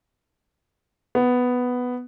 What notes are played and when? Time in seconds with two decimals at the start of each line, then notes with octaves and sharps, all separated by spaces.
1.15 B3